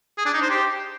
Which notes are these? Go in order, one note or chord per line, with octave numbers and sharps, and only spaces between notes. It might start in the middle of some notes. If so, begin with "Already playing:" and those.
G#4
D4
D#4
C5
G4